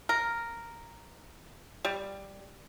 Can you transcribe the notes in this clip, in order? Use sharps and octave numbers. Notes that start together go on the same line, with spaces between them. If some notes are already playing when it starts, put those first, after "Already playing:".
A#4
G3